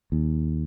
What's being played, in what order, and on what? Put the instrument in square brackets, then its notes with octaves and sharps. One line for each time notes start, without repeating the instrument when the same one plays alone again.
[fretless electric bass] D#2